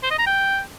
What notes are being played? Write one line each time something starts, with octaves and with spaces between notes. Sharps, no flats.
C5
D#5
A#5
G5